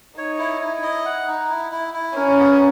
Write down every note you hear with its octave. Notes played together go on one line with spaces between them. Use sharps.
D#4 C#5
E4
E4
D#5
F#5
D#4
E4
E4
E4
C#4 A#4
B3